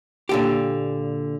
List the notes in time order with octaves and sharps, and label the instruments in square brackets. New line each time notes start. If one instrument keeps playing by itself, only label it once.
[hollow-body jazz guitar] A#2 D3 G4